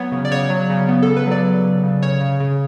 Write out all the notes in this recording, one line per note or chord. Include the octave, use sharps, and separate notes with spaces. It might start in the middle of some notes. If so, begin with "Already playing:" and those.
Already playing: F#3 B3 C#5
C#3
D5
C#3 C#5
F#3
C#3
B3
A4
C#3
B4
F#3 D5
F#3
C#3
C#3
C#3 C#5
C#3
C#3